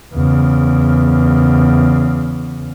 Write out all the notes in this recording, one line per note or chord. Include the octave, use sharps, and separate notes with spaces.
E2 C#3